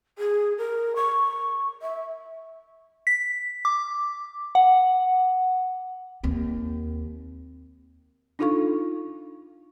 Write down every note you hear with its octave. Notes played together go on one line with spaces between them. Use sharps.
G#4
A#4
C#6
E5
B6
D6
F#5
D#2 C4
D4 D#4 F4 A4 F5 C#6